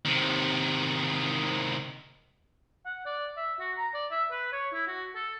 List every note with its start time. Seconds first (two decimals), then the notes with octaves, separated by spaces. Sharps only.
0.05 C3 D#3
2.86 F#5
3.06 D5
3.37 E5
3.60 F#4
3.77 A#5
3.94 D5
4.11 E5
4.31 B4
4.53 C#5
4.73 E4
4.87 F#4
5.15 A4